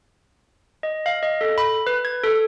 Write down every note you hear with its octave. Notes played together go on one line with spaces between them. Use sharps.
D#5
F5
D#5
A4
B5
B4
G#6
A4